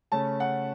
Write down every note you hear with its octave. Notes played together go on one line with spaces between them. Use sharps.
C#3 A3 C#4 A5
F#5